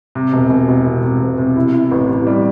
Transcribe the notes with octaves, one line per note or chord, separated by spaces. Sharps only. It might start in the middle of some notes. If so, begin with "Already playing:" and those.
C3
E1
E1
E1
C3
C3
E1
C3
E4
E4
A1
A1
G3